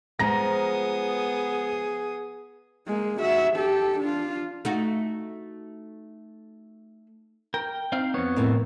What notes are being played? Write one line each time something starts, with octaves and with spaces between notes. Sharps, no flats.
F3 G#3 B3 G#4 A#5 D#6 A#6
G#3 A#3
F#4 E5
G4 A4
D4 F4
A3 D#4 F#4
A#4 G5
C4 D#4 F5
F2 B3 C#5
A2 A#3 C4